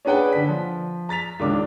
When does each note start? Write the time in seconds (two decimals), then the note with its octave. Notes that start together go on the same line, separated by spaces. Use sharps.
0.05 C#4 D4 G#4 B4 F#5 G5
0.33 D3 B6
0.49 F3
1.09 A#5 A6 B6 F7
1.39 C#2 D#3 D4 D6